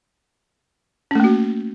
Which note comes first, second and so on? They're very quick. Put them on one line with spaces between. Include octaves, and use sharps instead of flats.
C#4 A3 A#3 F#4